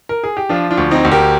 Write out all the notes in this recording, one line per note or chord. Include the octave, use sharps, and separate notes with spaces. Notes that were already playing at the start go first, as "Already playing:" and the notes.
A#4
G#4
G4
F3 D4 F4
D4 F4
D2
C4 D#4
D2
G4 A#4